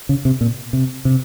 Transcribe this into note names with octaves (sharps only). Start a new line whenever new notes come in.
C#3
C3
A#2
C3
C3